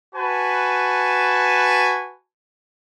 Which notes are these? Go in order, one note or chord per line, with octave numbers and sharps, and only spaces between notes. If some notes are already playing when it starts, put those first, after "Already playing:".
F#4 B4 G#5 A5